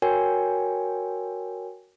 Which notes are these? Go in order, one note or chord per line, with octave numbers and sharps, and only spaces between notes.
F#4 A#4 C#5 G5 G#5